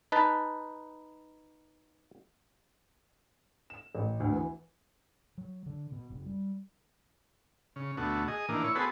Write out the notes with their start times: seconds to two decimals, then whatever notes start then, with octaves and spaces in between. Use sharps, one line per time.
0.12 D#4 B4 A5
3.70 E7
3.95 A1
4.20 D2
4.32 E3
5.38 F#3
5.66 D3
5.92 B2
6.10 F#1
6.26 G3
7.76 C#3
7.97 D2 B2 A3 F#4
8.28 G#4 D#5
8.49 A#2 D#3 E3 A#3 D4
8.64 E4 C#5
8.75 B3 F#4 G#4 A4 B4 C5